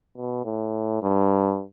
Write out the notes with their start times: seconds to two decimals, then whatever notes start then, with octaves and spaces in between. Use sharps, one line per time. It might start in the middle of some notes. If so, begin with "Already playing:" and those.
0.17 B2
0.45 A2
1.03 G2